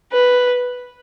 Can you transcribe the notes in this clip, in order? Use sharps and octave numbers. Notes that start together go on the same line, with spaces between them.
B4